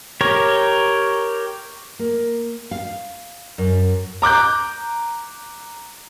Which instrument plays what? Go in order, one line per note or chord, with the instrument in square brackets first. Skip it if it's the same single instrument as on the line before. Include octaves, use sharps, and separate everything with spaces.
[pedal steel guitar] G4 A#4 C#5
[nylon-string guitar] A#3
F5
F#2
[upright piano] A#5 D6 F#6 G6